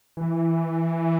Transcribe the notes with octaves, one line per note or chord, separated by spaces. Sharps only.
E3